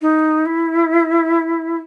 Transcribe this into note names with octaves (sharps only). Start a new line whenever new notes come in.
D#4
E4